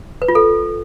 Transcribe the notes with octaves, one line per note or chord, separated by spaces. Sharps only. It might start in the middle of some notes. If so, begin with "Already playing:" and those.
B4
F4
A4